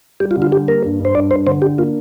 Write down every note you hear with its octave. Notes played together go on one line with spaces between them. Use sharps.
G3 G4
F4
D3
F4
G3 G4
A#3 A#4
G2
G2
C5
G2 D5
G2 C5
D3 C5
D4 G4
A#3 F4